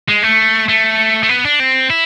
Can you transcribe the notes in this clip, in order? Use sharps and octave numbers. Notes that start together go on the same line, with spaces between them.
G#3
A3
A3
A3
B3
D4
C4
E4